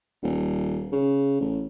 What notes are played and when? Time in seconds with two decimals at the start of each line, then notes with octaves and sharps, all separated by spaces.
0.23 D#1
0.92 C#3
1.41 A1